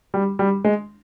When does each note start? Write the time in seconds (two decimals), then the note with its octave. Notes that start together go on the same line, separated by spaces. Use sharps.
0.14 G3
0.39 G3
0.64 G#3